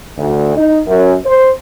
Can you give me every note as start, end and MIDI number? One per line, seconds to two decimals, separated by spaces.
0.18 0.54 38
0.57 0.78 63
0.87 1.14 42
1.26 1.50 72